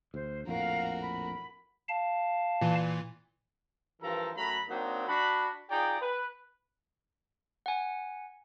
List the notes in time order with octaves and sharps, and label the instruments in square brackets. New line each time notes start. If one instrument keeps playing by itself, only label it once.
[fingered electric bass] D2 [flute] C5
[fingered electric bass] A#1 F2 A2 [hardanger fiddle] F#4 A#4 [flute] F5
[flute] B5
[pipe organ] F5 A5
[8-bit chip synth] A#2 E3
[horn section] G2 E3 F3 A4 A#4 A#5
F#2 F#3 A3 A#5 B5
F#3 A#3 C4 D4 D#4
D4 F#4 B5
D#4 F4 G#4 D5 G5
B4
[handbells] F#5 G#5